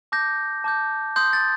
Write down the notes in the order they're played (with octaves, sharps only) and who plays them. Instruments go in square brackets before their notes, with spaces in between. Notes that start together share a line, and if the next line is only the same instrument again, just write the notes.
[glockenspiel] A5 D6 G6 A#6
A5 D6 G6
C6 D#6 G6
A6